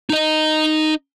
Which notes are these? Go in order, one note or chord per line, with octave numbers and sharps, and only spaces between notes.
D#4 D#5